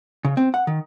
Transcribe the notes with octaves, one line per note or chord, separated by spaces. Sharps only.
C#3
C4
F#5
D#3